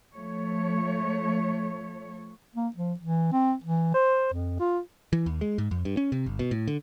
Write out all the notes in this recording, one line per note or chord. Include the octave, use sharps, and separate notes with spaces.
F3 A3 C#5
A#3
F3
E3
C4
E3
C5
F2
F4
E3
D#2
G#3
G#2
F2
G2
C#4
C3
G1
B2
A2
D3